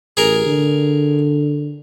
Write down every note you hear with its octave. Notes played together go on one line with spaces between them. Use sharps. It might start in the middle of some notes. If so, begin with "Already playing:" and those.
A1 G#4 A#4
D3